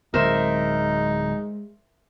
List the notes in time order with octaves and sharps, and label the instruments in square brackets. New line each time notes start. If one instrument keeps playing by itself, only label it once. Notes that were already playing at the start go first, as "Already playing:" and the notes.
[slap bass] D1 [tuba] G#3 [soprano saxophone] D#4 [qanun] A#4 C5 E5